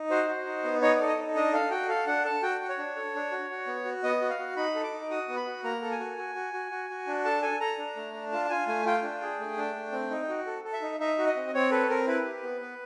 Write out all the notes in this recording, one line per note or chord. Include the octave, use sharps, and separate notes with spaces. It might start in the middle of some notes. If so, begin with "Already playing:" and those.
Already playing: D#4
F#4 C5
F#4
D#4
B3
D#4 C#5
A4 D5
D#5
D#4
D4 D#5
A4 F5
F#4 G5
A4 F5
D4 F#5
A4 A5
F#4 G5
F#4
C#5
D4
A4
D4
F#4
F#4
B3
F#4
B3 D#5
F#4
F5
F#4
D#4 B5
A4
D6
D#4
F#4 D#6
B3
B5
F#4
A#3 A#5
A4
G#5
F#4
F#4
F#4
F#4
F#4
F#4
D4
A4 A5
A4 G#5
A4 A#5
D4
A3
D4
F4 A5
A5
F4 G#5
A3 G#5
F4 G5
D4
G#4
A3
D4
A3
C4
D#4
F#4
A4
A4
E5
D#4
D#4 E5
F#4
D#5
C4
C4 C#5
A4 B4
C4 A#4
E4 B4
G4
B3
B3